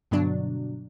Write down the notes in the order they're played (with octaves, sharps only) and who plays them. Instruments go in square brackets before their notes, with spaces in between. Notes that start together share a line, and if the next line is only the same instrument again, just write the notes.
[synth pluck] G2 B2 D3 F#3 D4